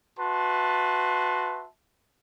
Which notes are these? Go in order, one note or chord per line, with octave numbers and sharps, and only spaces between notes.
F#4 B4 E5 A5 C6